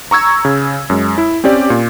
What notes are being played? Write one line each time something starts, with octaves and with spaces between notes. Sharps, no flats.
A#5 C#6 E6 G#6
C#3
F#2 G#3
E4
C4 C#4 G4 D5
A#2